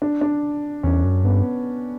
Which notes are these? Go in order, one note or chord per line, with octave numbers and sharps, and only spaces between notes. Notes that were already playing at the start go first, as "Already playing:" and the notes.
D4
D4
E2 C#4
F#2
G2 B3